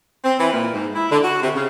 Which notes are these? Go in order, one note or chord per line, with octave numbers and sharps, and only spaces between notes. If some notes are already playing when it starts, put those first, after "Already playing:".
C4
E3
A#2
G#2
E4
D3
F#4
C3
C#3